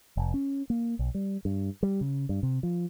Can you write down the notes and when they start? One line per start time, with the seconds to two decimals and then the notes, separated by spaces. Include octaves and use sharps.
0.17 F1
0.34 C#4
0.70 A#3
0.99 B1
1.14 G3
1.45 G2
1.83 G3
2.01 C#3
2.29 G2
2.43 C3
2.63 F3